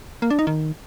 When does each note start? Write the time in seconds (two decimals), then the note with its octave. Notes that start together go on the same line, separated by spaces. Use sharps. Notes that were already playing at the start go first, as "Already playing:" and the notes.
0.22 A#3
0.30 D4
0.39 D#4
0.47 D#3